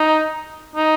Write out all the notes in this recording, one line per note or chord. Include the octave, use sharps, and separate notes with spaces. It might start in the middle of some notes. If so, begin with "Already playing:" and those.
Already playing: D#4
D#4